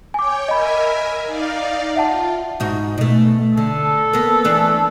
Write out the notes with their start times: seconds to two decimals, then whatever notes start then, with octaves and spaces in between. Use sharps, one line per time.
0.14 C#5 G5 G#5 D6
0.48 A#4 D#5 E5 G#5 B5
1.24 D#4 D5 F5
1.96 F4 E5 F#5 A5
2.60 G#2 D#4 F#4
2.98 B2 A3
3.57 D3 A4
4.13 A#3 B3
4.44 E3 A3 D4